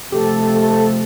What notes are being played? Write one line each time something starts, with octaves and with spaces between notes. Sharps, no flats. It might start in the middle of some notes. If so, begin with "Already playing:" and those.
C3 F3 A3 G4 A4
A4